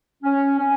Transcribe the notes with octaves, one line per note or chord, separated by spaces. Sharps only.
C#4
C#4